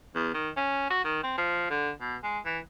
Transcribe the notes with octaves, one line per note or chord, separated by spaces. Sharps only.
E2
D#3
C#4
F#4
D#3
C4
F3
D3
B2
G#3
E3